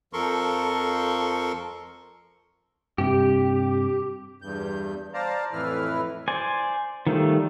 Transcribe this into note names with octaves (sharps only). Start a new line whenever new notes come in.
F2 F3 A4 A#4 C6 C#6
G2 C3 G4
E2 G2 G6
C5 D5 F5 A5 A#5
F2 A2 E3 E4 B4 F6
C5 D5 G#5
D#3 F3 G3 A3